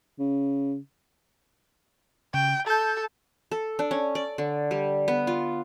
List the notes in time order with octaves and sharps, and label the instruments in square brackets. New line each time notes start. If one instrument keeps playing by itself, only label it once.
[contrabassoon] C#3
[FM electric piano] C#3 [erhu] G5
[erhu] A4 [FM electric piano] A5 G6
[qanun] A4
D4
C#4
D5
D3
G3
B3
F4